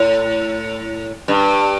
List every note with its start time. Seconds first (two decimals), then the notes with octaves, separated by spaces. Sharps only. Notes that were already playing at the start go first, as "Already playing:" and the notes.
Already playing: A2
1.28 G2